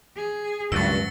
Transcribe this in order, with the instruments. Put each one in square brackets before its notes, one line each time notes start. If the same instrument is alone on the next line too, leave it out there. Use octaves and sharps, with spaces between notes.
[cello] G#4
[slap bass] C#2 D#3 [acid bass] G2 [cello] F#3 F#4 [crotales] E6 A6